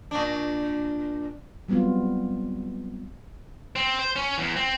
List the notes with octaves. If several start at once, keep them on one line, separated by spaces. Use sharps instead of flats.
A#2 D4
F#3 G3 B3 C4 F4
C4
C5
C#4
E2
C4